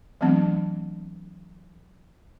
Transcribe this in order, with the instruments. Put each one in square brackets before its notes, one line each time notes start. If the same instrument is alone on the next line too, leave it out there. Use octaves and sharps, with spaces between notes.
[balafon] E3 F#3 A3 B3 C4 D4